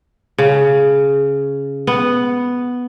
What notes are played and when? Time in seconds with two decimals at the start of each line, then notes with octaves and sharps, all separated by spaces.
0.38 C#3
1.87 B3